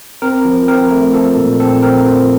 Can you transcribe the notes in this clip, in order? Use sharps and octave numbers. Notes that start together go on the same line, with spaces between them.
C4 A#4
F3
C4 A#4
A3
F3 A4
A#2
C4 A4
C4 A#4
F3